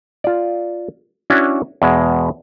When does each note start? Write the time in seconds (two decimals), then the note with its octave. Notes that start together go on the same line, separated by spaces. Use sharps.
0.24 F4 D5
1.30 C#4 D4 E4 F#4 G#5
1.82 E2 B2 G#3